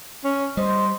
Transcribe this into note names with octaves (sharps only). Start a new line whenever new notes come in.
C#4
G3 C5 D#5